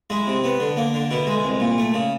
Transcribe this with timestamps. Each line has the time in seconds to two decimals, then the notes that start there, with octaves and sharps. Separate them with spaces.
0.10 G#3 E4
0.27 C3
0.44 B3
0.60 D3
0.77 A#3
0.94 D3
1.11 B2 E4
1.27 G#3
1.44 C2
1.60 A#2
1.78 A3
1.94 C#3